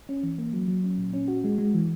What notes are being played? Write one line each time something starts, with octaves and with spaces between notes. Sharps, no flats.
C#4
E3
A#3
F#3
F#3
C#4
A#2
C#4
F#4
G#3
G#3
E3